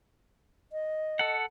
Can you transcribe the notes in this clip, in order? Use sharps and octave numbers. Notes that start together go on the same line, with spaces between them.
D#5
A4 F#5